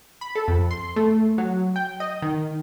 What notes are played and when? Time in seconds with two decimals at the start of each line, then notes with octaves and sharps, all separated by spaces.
0.21 B5
0.35 A4
0.48 F2
0.71 C6
0.96 A3
1.38 F#3
1.76 G5
2.00 D#5
2.22 D#3